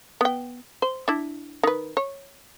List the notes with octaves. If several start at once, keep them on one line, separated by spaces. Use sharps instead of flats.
B3 G5
C5
D4 E4
D#3 B4
C#5